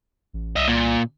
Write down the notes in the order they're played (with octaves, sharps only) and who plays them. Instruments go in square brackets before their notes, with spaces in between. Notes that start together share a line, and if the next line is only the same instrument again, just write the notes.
[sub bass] A1
[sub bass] C2 [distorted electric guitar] D#5 E5
[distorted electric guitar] A#2